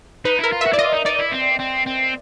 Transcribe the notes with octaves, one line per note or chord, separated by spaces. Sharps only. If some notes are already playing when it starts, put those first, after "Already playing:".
D#4 B4
E4 A#4
F4
F#4 E5
E4 D5
F4 D#5
D#4
D#4 D5
E4
C4
C4
C4